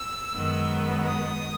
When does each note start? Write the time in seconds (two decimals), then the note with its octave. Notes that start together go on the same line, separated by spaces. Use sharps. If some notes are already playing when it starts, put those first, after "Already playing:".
Already playing: E6
0.33 F#2 D#3 G#3 B3
1.06 D#6